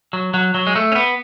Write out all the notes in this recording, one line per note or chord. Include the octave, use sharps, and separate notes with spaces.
F#3
F#3
F#3
G#3
A3
C#4
B3